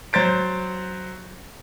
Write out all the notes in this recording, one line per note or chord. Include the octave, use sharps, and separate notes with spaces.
F#3 C5 A6 D7